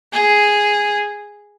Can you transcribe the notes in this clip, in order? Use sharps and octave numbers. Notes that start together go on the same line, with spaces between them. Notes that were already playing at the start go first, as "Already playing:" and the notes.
G#4